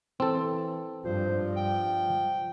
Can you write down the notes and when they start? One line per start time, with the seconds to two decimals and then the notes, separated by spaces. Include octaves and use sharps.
0.20 E3 C4 A4
1.05 G2 F3 C5
1.57 G5